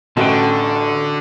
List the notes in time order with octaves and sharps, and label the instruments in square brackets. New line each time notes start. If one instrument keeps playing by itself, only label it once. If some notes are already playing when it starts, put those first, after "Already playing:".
[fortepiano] A1 [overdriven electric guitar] D3 [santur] F#4 D#5 [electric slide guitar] G5 A5